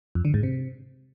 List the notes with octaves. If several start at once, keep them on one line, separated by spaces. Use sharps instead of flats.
F2
D3
G#2
C3